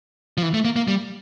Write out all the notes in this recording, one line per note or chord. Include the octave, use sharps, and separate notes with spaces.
F3
E3
A3
A#3
A#3
G3